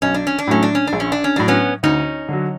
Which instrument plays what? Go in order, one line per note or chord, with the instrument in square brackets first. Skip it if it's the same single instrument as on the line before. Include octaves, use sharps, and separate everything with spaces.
[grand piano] B1 [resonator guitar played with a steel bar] C#4
[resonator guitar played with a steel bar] D4
C#4
D4
[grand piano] A2 F#3 A3 [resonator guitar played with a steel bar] C#4
[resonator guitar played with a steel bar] D4
C#4
D4
[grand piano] A#1
[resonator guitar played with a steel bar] C#4
D4
C#4
[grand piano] A2 F#3 [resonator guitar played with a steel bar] D4
[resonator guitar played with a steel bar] B3 C#4
[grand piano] D2 [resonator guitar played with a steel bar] C#4 D#4
[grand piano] D3 F#3